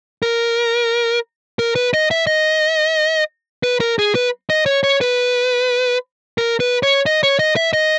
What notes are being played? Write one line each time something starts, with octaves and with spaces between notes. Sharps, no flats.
A#4
A#4
B4
D#5
E5
D#5
B4
A#4
G#4
B4
D#5
C#5
C#5
B4
A#4
B4
C#5
D#5
C#5
D#5
E5
D#5